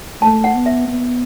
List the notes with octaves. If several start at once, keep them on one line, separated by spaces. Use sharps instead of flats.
A3 A5
F#5
B3
E5
B3